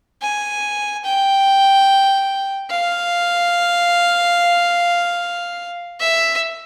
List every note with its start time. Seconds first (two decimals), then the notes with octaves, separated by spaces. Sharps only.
0.22 G#5
1.05 G5
2.70 F5
6.00 E5